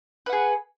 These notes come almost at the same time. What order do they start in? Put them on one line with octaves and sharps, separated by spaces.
B4 F#5 G#4